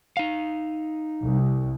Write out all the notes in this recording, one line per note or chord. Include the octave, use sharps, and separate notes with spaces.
D#4 F5
C2